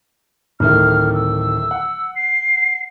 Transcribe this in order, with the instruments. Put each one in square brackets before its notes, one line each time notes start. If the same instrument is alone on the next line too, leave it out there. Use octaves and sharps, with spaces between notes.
[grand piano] D1 D#3 A3 [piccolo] F6
[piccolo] E6
[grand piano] F#5
[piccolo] C7